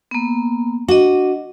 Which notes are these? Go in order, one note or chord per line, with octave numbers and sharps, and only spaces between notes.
A#3 B3
D4 F#4 D#5